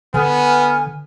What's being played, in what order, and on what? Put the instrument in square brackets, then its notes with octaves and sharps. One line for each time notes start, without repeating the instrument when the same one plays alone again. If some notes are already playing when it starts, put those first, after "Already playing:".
[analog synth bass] D3 [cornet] B3 [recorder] G#5 [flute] F6